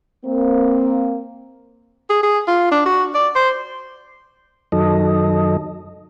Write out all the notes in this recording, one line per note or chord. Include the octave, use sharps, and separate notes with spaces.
A#3 C4
G#4
G#4
F4
D4
F#4
D5
C5
F#2 D#3 F#3 A4 D#5